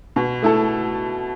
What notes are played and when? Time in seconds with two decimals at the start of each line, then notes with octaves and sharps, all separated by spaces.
0.16 B2
0.42 A3 E4 A4